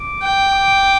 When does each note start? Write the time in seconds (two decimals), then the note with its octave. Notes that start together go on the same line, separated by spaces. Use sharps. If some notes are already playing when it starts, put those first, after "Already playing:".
Already playing: D6
0.23 G5
0.54 D6